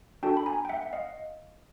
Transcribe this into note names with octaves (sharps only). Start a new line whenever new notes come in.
D4 F#4 A4 G5 A5
B5
G#5 A#5
G5
E5 F#5
F#5
D#5 F5